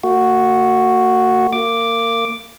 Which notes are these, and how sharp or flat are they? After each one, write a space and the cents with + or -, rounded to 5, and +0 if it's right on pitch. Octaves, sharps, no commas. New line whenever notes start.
A#3 -40 F#4 +0
A#3 -25 D6 +0